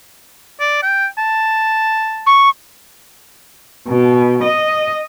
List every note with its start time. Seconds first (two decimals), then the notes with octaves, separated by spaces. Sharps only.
0.60 D5
0.82 G5
1.18 A5
2.26 C#6
3.88 B2
4.43 D#5